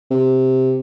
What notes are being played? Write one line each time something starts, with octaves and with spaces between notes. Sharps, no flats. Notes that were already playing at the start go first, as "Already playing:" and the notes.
C3